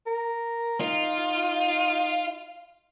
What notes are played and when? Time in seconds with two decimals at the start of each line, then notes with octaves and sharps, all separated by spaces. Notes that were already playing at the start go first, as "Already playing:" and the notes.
0.07 A#4
0.80 D#4 F4